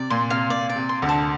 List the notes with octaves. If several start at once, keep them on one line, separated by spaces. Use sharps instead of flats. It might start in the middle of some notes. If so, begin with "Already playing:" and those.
Already playing: C3 D5
A#2 C6
C3 F5
A#2 D5
D5
C3
C6
D2 D3
A5